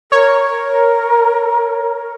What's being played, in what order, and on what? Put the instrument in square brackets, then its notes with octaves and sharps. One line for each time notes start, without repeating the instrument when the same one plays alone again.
[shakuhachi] A#4 [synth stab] C#5